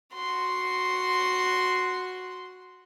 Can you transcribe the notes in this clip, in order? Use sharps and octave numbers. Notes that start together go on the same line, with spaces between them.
F#4 C6